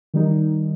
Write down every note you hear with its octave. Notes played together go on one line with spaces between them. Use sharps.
D#3 G3 D#4